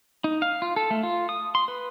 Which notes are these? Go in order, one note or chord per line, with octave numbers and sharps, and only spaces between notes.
D#4
F5
F4
A4
A3
F4
D#6
C6
B4